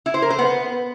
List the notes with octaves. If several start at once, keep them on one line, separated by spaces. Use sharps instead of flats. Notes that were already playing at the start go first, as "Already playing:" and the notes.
E4
C5
A#4
C5
B3